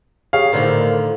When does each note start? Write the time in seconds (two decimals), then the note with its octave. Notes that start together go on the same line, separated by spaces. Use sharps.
0.33 G4 G#4 C#5 F5
0.53 A2 D3 D#3 A#4 C5 D5